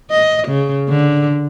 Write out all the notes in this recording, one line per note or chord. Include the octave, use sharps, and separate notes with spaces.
D#5
C#3
D3